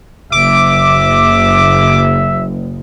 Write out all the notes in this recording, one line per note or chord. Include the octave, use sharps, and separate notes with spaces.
F#1 E5 D6